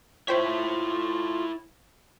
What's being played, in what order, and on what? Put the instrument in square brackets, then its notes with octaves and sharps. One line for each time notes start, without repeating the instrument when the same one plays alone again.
[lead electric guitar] E4 C#5 [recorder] F4 [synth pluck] C5 G5 B6